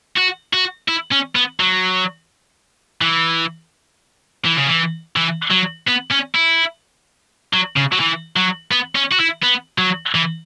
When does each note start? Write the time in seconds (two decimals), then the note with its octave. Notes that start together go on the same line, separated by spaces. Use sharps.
0.16 F#4
0.53 F#4
0.88 E4
1.12 C#4
1.35 B3
1.60 F#3
3.02 E3
4.45 E3
4.56 C#3
4.67 E3
5.16 E3
5.51 F#3
5.87 B3
6.11 C#4
6.35 E4
7.53 F#3
7.76 C#3
7.93 F#3
8.00 E3
8.37 F#3
8.71 B3
8.95 C#4
9.12 F#4
9.20 E4
9.43 B3
9.78 F#3
10.15 E3